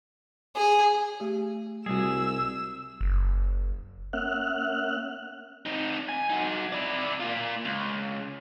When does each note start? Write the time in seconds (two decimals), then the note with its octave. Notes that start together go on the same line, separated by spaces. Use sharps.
0.56 G#4
1.20 A3 G4
1.86 C2 G3 F#4 G#4 E6
3.01 F#1
4.13 A#3 C#4 E5 F#5 F6 F#6
5.66 C4 D#4
6.09 G#5
6.30 D#4 F#4
6.72 E4 D5
7.20 A#3 F4
7.65 C#2